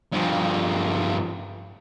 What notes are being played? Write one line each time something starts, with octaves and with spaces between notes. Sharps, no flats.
G2 F3